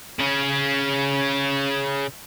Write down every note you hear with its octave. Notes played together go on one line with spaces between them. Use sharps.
C#3 C#4